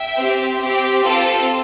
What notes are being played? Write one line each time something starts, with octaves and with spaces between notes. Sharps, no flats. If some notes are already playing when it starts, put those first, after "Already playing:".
Already playing: E5 G5
C4 G4
C4 G4
C4 F4 A4